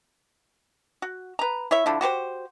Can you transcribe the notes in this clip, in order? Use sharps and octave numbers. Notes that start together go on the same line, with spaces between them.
F#4
B4 A#5
E4 C#5 E5
D3 F3 E4
F#4 G4 B4 C5